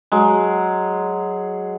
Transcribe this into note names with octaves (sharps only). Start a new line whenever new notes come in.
F#3 G#3